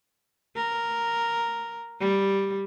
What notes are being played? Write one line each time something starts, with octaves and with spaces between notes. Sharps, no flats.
A#4
G3